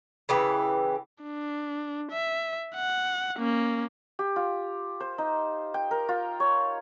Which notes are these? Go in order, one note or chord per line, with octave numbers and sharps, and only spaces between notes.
C#3 E3 G4
D4
E5
F#5
A#3 C#4
G4
F4
C5
D#4
G5
A#4
F4
C#5